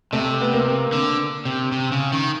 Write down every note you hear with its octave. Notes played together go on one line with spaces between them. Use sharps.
C3 A3
B3
A#3
D3
C3
C3
C#3
D#3